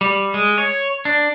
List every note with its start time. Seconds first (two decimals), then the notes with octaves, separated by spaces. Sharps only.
0.01 G3
0.34 G#3
0.58 C#5
1.05 D4